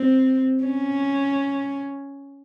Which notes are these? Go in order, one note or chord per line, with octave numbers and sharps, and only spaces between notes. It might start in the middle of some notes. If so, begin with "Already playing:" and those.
Already playing: C4
C#4